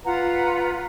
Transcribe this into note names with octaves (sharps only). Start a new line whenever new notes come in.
F4 B4 F#5 A#5